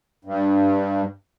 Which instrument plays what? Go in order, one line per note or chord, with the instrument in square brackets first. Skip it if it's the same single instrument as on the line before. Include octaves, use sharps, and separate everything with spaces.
[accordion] G2